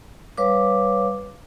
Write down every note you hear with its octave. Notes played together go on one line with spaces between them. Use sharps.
G3 B4 C#5 F5 D6